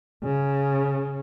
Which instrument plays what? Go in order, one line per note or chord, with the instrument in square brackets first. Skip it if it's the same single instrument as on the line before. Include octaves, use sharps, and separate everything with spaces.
[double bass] C#3